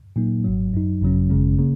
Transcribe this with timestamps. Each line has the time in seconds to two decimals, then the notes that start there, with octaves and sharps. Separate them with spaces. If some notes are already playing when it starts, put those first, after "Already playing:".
0.16 A#2 F#3 A#3 D#4
0.44 G#1 G#2 F#3
0.74 F#2 F#3 D#4
1.02 G#1 F#2 C#3 F#3 C#4
1.30 G#1 F#2 C#3 G#3 C#4
1.58 C#3 A#3